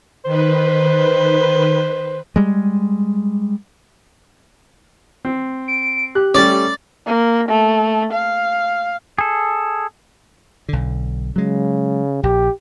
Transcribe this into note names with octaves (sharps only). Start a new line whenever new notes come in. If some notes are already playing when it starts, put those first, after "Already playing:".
D#3 B4 C5
G3 G#3
C4
D7
G4 F#6
G3 A3 C#4 D5
A#3
A3
F5
G#4 A4
B1 D3
C#3 F#3 G#3
A#1 G4